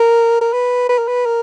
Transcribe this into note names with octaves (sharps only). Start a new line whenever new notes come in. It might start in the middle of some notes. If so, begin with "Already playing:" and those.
Already playing: A#4
A#4
B4
B4
A#4
B4
A#4